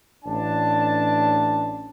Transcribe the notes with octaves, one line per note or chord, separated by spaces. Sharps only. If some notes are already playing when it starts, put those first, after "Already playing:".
A1 C#4 D4 A5